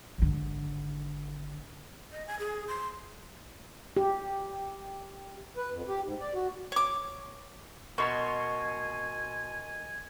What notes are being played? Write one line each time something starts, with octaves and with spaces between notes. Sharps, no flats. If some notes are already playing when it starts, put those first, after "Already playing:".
G#1 D3
D#5
G#5
G#4
C6
G4
B4
F2
G4
G#2
D5
F#4
C#5 D6
B2 A#4 D#5 G#5 A#5 C6 C#6